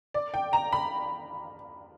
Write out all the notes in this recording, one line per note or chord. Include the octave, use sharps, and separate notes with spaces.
D5
G5
A#5
B5